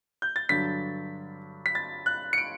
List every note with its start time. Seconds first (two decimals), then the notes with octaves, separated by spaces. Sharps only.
0.22 G6
0.36 A6
0.49 G2 D3 F#3 B6
1.66 B6
1.75 A6
2.06 F#6
2.33 C#7
2.38 D7